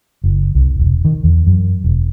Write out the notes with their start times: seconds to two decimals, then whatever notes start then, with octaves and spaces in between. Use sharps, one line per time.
0.24 F#1
0.55 C2
0.79 E1
1.05 D#3
1.24 E2
1.47 F#2
1.84 E1